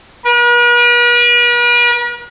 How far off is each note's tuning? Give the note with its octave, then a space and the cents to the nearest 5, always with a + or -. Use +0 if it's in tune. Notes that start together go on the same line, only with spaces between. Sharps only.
B4 -45